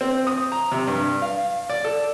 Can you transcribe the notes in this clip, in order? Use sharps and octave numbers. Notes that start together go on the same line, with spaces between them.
C4
D#6
A#5
C3
G2
F5
D5
A4